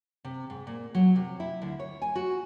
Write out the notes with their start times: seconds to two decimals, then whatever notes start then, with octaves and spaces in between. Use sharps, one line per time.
0.24 C3
0.50 G#2
0.67 A#2
0.95 F#3
1.16 C3
1.40 E4
1.62 D2
1.79 C#5
2.02 G#5
2.15 F#4